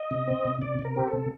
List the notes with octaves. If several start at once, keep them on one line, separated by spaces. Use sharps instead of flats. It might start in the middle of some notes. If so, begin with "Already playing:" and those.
Already playing: D#5
C3
C4
C3
C3 D5
C3
A#4
C4 G4
A4
C3